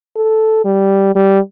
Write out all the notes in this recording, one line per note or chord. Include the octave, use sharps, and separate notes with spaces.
A4
G3
G3